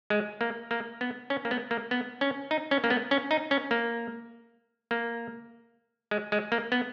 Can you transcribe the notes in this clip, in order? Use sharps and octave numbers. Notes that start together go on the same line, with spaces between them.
G#3
A#3
A#3
B3
C#4
A#3
B3
A#3
B3
C#4
D#4
C#4
A#3
B3
C#4
D#4
C#4
A#3
A#3
G#3
G#3
A#3
B3